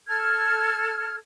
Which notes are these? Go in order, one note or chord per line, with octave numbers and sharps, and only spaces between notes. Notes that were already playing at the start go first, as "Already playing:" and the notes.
A4 F6 G#6